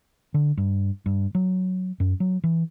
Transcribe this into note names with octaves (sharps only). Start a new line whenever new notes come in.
D3
G2
G2
F#3
F#2
F#3
E3